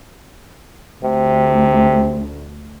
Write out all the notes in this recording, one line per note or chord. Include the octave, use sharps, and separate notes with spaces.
D2 C3